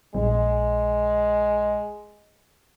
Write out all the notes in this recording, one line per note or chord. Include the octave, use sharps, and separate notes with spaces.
A#1 G#3